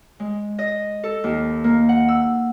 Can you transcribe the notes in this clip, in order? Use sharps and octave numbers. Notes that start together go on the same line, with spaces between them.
G#3
D#5
A4
D#2
A#3
F#5
E6